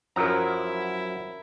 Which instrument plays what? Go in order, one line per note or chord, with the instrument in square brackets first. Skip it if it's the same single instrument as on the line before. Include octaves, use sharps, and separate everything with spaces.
[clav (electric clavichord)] F#2 F3 F#3 [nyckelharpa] E4 [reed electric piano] A#4 A#5